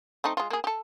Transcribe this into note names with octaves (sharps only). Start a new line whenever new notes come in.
A3 C4 D#4
G#3 F4
A#3 G#4
G4 A4